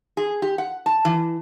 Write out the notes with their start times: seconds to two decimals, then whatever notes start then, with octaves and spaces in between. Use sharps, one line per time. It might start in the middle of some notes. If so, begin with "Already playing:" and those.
0.17 G#4
0.42 G4
0.58 F#5
0.86 A5
1.05 E3